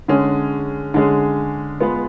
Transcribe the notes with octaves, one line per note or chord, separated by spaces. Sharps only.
D3 G#3 C#4 G#4
D3 G#3 C#4 G#4
G#3 B3 F4 G#4 B4